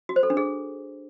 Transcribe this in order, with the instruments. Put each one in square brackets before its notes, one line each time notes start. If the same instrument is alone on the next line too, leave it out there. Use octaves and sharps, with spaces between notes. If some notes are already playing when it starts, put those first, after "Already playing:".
[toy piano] F#4
C5
A4
D4
G#4